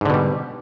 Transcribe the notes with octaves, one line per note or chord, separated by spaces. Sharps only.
G#2 B2 D3 G3